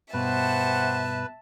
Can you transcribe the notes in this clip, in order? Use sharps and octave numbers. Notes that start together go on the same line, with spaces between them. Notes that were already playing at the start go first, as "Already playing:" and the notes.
G2 B2 G4 B4 C5 E5 F#5 A5